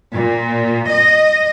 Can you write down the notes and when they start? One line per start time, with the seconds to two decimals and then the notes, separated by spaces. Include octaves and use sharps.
0.13 A#2
0.89 D#5